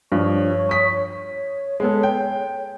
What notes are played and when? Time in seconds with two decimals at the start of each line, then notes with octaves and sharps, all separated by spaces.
0.12 G2 F3 C#5 C#6
0.69 D#6 B6
1.26 C#5
1.80 G#3 B3 A4
2.03 G5